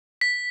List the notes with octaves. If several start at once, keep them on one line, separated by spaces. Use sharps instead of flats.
B6